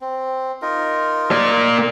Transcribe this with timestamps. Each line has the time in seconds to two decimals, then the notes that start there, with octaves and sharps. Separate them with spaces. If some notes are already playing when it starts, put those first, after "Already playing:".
0.01 C4
0.62 D#4 F4 A#4
1.31 A#3 D5